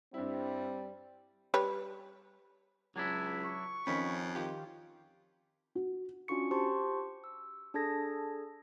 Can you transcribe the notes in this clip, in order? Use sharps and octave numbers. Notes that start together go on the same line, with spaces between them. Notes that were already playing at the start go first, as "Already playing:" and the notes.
G2 G3 C4 E4
G3 B4 C#5
C#2 F#3 D4 E4 G#5
C#6
F2 D#3 F3 C#4 B5
D#3 F4 G4
F#4
C#4 D4 F4 F#4 C#6 C#7
G4 C5 A5 C6 C#6
E6
D4 G#4 A4 A5 G#6 A#6